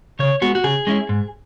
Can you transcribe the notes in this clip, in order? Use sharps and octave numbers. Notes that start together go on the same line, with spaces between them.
C#3 C#5
G#3 B3 F#4
F#4
C#3 G#4
G#3 C#4 E4
G#2